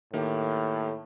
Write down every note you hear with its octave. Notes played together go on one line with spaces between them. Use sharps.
A2 D#3 A#3 G4